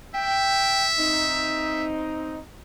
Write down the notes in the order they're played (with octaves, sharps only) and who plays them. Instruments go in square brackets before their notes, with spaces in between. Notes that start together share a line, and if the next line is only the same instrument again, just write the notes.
[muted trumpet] E5 [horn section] G5
[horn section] C4 D#4